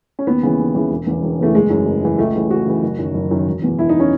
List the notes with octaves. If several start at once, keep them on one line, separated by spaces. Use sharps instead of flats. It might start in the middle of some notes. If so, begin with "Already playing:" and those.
C#4
D#2 B3
C#3 E3
D#2
C#3 E3
E1
E2 C#3 E3
E1
E2 C#3 E3 A3
F#1 G#3
F#2 E3
F#1
F#2 E3
C#2 A3
C#3 E3
C#2 F#4
C#3 E3
F#1
F#2 D#3
F#1
F#2 D#3
E1
E2 B2
E1 E4
D#4
B2 C#4